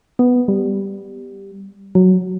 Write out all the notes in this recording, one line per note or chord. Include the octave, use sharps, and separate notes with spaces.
B3
G3
F#3